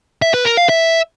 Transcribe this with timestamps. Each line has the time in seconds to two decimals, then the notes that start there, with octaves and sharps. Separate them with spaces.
0.22 E5
0.34 B4
0.46 A#4
0.57 F5
0.69 E5